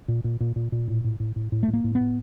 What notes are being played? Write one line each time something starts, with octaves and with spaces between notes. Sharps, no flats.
A#2
A#2
A#2
A#2
A#2
A2
A2
A2
A2
A2
A2 A3
A#3
A2
B3
A2